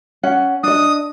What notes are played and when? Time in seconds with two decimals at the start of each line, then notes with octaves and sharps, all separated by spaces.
0.23 C#4 F#5
0.63 D4 D#5 D#6